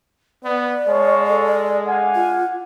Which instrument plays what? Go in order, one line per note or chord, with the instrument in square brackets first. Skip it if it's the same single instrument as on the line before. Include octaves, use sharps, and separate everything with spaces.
[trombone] B3 [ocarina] D5
[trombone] G#3 [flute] C#5 [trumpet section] F5 A5 C#6
[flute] A4
[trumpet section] D4 F5 G#5 [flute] F#5
[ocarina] F4